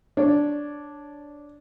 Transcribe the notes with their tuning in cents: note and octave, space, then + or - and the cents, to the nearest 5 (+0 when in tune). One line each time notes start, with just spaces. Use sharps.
D4 -5 C#5 +0